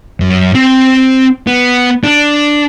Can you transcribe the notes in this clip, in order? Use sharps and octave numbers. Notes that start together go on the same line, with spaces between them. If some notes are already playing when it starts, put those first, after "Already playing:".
F#2
C4
B3
D4